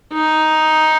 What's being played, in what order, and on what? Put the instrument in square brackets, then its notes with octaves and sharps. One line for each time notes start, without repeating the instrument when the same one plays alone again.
[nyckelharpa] D#4